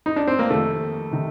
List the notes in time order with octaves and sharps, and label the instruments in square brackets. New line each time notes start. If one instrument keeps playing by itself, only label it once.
[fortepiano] D#4
D4
C4
A#3
[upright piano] F2 C3 D#3 [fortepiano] A3
[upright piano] C3 D#3